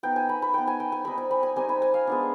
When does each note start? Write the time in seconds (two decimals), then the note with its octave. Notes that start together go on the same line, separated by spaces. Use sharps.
0.03 B3 D#4 G5
0.16 G#5
0.29 B5
0.42 B5
0.54 B3 D#4 G5
0.67 G#5
0.80 G5
0.92 G#5
1.05 G3 C4 D#4 B5
1.18 G#5
1.31 B5
1.43 G#5
1.56 G3 C4 D#4 G#5
1.69 B5
1.82 G#5
1.94 F5
2.07 G#3 B3 D4